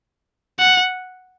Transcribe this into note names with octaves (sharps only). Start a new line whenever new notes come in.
F#5